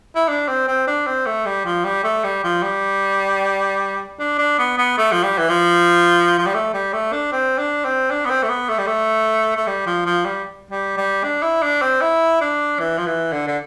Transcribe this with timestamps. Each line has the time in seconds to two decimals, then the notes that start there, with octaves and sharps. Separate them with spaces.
0.15 E4
0.28 D4
0.48 C4
0.67 C4
0.87 D4
1.07 C4
1.26 A3
1.46 G3
1.65 F3
1.84 G3
2.04 A3
2.24 G3
2.44 F3
2.62 G3
4.19 D4
4.38 D4
4.58 B3
4.78 B3
4.98 A3
5.12 F3
5.23 G3
5.38 E3
5.49 F3
6.38 F3
6.46 G3
6.54 A3
6.73 G3
6.93 A3
7.12 D4
7.32 C4
7.58 D4
7.85 C4
8.11 D4
8.25 B3
8.30 C4
8.43 A3
8.49 B3
8.69 A3
8.78 G3
8.87 A3
9.56 A3
9.67 G3
9.86 F3
10.06 F3
10.25 G3
10.71 G3
10.97 G3
11.23 D4
11.42 E4
11.62 D4
11.82 C4
12.01 E4
12.41 D4
12.79 E3
12.98 F3
13.06 E3
13.32 D3
13.47 D3